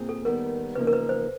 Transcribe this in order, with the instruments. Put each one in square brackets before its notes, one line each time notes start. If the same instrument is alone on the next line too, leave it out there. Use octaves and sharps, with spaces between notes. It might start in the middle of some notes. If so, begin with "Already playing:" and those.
Already playing: [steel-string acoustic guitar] A#2 C4 G#4
[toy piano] A4
[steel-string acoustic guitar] D#2 D#3 G3 B3 [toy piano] A#4
[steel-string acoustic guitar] E2 C#3 F3 A#3 D#4 [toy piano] B4
[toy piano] A#4
B4
C5